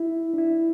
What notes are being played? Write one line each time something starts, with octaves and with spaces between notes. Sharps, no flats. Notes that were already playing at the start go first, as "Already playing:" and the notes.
Already playing: E4
D4
E4